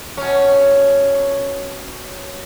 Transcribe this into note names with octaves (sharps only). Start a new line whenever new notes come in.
B2 C#4